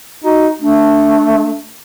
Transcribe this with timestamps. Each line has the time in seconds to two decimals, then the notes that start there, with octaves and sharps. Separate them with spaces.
0.24 D#4 F#4
0.62 A3 D4